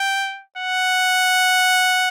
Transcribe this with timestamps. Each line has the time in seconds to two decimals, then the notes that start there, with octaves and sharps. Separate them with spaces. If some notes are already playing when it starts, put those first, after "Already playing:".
Already playing: G5
0.57 F#5